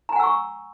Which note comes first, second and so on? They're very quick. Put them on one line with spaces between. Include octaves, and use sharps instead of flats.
A#5 G#5 F#5 E6 C#6